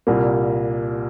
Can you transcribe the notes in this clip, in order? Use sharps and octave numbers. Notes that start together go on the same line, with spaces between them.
C2 A#2 G3 A#3